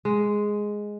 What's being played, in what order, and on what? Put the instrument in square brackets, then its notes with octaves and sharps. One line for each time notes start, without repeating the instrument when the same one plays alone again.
[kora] G#3